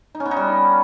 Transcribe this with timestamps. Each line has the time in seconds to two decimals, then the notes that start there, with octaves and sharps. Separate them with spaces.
0.15 D#4
0.20 C#4
0.26 B3
0.31 D#4
0.37 G3